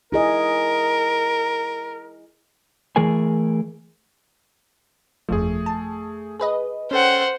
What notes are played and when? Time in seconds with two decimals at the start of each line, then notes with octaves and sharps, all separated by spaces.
0.12 E4 G#4 A#4 D#5
2.96 E3 A3 G#4 A#4 G#5
5.29 G1 F2 F3 A3 G#4
5.66 A5
6.40 G#4 B4 D#5
6.91 C#4 A4 C5 F#5 G5